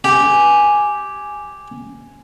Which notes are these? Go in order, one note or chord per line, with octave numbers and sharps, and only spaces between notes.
G4 G#5